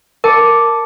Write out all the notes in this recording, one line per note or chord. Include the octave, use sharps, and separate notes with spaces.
A#4 A5 D6 C#7